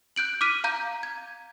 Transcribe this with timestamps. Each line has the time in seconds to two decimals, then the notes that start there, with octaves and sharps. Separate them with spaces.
0.16 F#6 G6 D7 F#7
0.41 D6 F6 B6 D#7
0.64 F5 A#5 G6
1.03 G#6